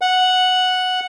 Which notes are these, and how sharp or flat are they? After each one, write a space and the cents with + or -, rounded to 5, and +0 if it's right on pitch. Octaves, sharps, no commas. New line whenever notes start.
F#5 -5